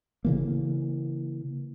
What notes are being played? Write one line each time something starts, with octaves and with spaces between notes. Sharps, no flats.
C#3 E3 A#3